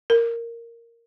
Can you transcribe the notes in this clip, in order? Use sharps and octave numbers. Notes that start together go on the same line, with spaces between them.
A#4